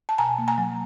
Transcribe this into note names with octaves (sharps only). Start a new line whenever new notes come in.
A5
B2 G#5 A#5
A#3
G#5 A#5
F#3